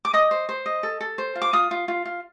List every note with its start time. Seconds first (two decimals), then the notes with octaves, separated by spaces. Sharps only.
0.05 D6
0.13 D#5 D#6
0.31 C5
0.49 C5
0.66 D#5
0.83 A4
1.01 A4
1.18 C5
1.35 F4
1.42 D6
1.53 F4 D#6
1.71 F4
1.88 F4
2.05 F4